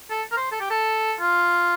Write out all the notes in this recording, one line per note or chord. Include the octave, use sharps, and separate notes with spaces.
A4
A#4
C5
A4
G4
A4
F4